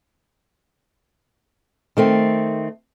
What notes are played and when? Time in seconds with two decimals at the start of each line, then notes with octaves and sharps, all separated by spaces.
1.97 D#3 A3 C4